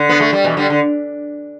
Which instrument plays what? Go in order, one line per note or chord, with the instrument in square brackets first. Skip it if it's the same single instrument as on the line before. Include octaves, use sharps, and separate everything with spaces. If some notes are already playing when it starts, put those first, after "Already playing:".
Already playing: [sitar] D3
B3
A3
G3
B2 E3
D3 G3
D3